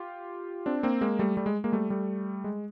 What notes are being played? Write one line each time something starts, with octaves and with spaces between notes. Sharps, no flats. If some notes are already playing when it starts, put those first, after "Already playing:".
Already playing: F4 G4
C4 D4
A#3 C4
G#3 A#3
G3 A3
G3 A3
G#3
G#3 A#3
G3 A3
G3 A3
G#3